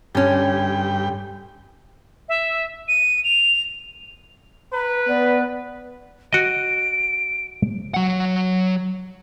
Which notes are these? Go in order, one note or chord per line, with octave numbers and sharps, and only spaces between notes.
G2 D3 C#4 G5
E5
D#7
F7
B4 A#5
B3 D5
F#4 D#5 D7
F#3 F#5